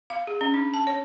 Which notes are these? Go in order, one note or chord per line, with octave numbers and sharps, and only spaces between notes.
F5
G#4
C#4
D4
A5
C#5